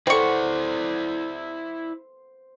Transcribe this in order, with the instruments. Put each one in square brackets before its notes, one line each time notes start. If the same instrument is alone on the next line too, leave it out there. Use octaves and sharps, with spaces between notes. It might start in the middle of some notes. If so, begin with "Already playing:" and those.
[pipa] C4 C#6 [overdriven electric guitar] E4 D5 [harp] A4 B5 [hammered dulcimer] C5 F#5